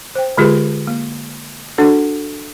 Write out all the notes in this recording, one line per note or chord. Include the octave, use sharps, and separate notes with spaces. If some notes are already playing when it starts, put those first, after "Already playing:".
C5 G5
D3 G#3 F4 G4 G#4 B4
A#3
D4 F#4 A4 F#5